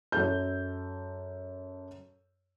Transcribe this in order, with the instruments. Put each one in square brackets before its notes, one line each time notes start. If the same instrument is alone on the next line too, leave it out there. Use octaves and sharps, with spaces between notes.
[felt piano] F#2 A4 G6